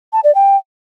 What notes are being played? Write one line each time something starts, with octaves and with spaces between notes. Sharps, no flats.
A5
D5
G5